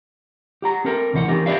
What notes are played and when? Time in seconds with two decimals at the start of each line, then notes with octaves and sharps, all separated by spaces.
0.62 G4 F#5 A#5
0.85 C4 A4 A#4
1.13 D2 C3 E3 B4 F#5
1.28 E3 B3 C4 D#4 G4 A#4
1.46 G4 B4 D5 E5 F5